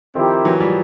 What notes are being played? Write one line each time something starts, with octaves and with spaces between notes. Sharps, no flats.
D#3 F3 C4 E4 G4 A#4
E3 F#3
F3 G3